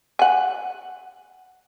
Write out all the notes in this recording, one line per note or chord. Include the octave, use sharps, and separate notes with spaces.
F#5 G#5